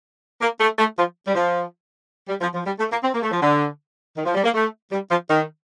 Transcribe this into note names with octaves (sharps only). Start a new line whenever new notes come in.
A#3
A3
A3
F3
G3
F3
G3
F3
F3
G3
A3
A#3
C4
A#3
A3
F3
D3
D#3
F3
G3
A#3
A3
G3
F3
D#3